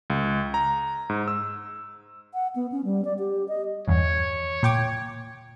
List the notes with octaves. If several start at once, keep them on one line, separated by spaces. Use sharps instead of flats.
C#2
A#5
G#2
E6
F#5
B3
C#4
G3
D5
G4
D#5
E2 G2 C#5
A#2 G5 D6